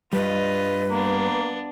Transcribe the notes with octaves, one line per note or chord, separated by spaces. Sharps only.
G2 G3 F4 B4 D#5
A#3 B3 D4